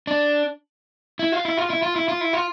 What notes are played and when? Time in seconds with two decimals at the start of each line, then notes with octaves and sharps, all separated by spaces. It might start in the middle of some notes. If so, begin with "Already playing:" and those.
0.07 D4
1.19 E4
1.32 F4
1.45 E4
1.57 F4
1.70 E4
1.82 F4
1.96 E4
2.08 F4
2.21 E4
2.33 F4